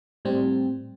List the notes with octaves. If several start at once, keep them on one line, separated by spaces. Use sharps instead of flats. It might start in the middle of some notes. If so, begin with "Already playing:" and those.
A2 G3 C4